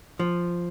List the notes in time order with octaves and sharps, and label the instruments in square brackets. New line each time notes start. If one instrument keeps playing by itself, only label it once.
[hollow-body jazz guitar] F3